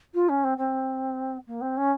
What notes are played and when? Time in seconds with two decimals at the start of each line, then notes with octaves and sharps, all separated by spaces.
0.14 F4
0.28 C#4
0.43 C4
0.57 C4
1.47 A#3
1.61 C4
1.76 C#4